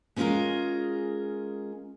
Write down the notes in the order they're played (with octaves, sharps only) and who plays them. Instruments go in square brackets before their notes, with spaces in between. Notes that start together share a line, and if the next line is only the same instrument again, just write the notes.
[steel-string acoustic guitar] G#3 B3 C#4 F4 G#4 A#4